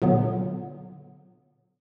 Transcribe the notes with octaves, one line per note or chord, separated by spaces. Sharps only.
A#2 D3 F#3 B3